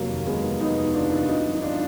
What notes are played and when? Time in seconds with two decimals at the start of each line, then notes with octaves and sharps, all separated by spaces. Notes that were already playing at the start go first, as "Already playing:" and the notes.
Already playing: F1 F#3 A#3
0.10 D#2
0.26 F1 G#3 B3
0.43 D#3
0.60 F1 B3 D#4
0.77 D#2
0.94 F1 D4 F4
1.12 D#3
1.28 G#1 D#4 F#4
1.45 F#2
1.55 D#4
1.62 G#1 D4 F4